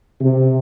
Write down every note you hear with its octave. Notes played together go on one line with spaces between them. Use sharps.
C3